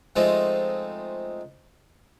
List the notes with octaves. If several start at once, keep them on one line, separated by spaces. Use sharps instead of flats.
F3 G#3 A3 C4 D#4